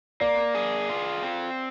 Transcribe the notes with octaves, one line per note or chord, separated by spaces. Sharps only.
A#3 D5
G#4
F4
C4